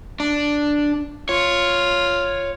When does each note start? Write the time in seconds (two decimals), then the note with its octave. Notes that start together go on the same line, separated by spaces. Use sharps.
0.20 D4
1.29 F4 C#5